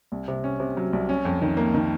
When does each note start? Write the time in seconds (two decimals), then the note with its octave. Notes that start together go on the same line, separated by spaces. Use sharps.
0.12 C2
0.28 C3
0.44 C#4
0.60 C3
0.77 F#3
0.93 C2
1.09 C#4
1.25 F2
1.42 D#3
1.57 A#3
1.74 D#3